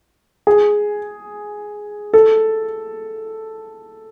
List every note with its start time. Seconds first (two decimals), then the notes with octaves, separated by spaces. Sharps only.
0.47 G#4
2.14 A4